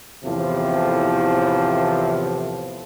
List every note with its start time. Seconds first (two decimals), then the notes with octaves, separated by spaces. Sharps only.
0.24 E2 A2 C3 E3 F3